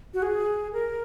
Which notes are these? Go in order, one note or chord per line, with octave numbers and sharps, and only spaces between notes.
F#4
G#4
A#4